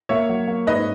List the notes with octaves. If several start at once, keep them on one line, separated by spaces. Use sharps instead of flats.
A#3 C#5 E5
F#3
A#3
G#2 B4 D#5